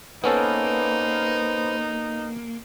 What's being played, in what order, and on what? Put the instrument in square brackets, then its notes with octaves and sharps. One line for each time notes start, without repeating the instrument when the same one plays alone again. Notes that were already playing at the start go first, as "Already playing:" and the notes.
[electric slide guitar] A#3 [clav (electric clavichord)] B3 C#4 A4 [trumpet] D#4 [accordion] B4 C5